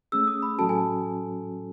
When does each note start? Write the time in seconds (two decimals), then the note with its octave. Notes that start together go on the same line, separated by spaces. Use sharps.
0.12 A3 C#4 G#4 E6
0.27 D#6
0.42 B5
0.59 A2 F#3 C#4 F#4 A4 A5
0.69 G#5